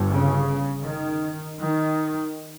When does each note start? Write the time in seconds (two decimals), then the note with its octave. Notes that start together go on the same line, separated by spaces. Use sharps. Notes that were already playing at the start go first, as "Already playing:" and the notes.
Already playing: G1 G2
0.11 C#3
0.85 D#3
1.60 D#3